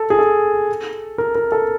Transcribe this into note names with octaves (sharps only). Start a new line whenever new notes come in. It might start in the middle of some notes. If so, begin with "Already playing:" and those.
Already playing: A4
G#4
A4
A#4
A#4
A4